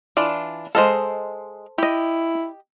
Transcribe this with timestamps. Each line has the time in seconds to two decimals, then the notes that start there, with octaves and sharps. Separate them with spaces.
0.17 E3 D4 F4 D5
0.75 G#3 A4 C5 D#5 F5
1.78 E4 G4 D#5